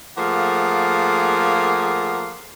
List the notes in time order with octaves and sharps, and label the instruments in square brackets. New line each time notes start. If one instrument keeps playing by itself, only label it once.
[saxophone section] F3 A3 A#3 G#4 F5 F#5